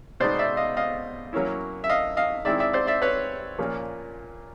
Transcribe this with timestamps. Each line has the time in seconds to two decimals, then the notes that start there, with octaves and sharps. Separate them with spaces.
0.20 B2 G#3 B3 D#4 C5 D5
0.39 D5 E5
0.57 D#5 F5
0.77 D#5 F5
1.33 F#3 A#3 C#4 E4
1.84 E5
1.90 D#5 F5
2.17 D#5 F5
2.45 D#3 G#3 C4 E4 D5 E5
2.60 D5 E5
2.73 C5 D5
2.87 D5 E5
3.02 B4 C#5
3.58 A#2 F3 A#3 C#4